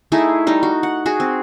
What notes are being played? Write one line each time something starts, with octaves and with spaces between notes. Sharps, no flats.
A3 D#4 E4 G#4
G3 D#4
F#4
F#5
F#4 G#4
C4